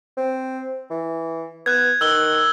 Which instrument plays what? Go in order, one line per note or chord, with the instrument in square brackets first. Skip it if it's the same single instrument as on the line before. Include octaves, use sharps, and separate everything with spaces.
[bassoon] C4
E3
[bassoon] B3 [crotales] F#6 G#6
[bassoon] D#3 [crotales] E6 G7